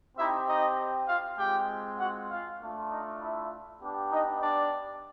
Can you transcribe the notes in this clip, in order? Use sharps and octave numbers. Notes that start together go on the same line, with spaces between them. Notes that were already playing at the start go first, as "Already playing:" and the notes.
C4 D#4 E4 G4 E5
D#4 D#5
F4 F5
G#3 C4 F4 G4 G5
F#4 F#5
F4 F5
A3 D4 F4
D#4 D#5
E4 E5
B3 D4 G4
D#4 D#5
D4 D5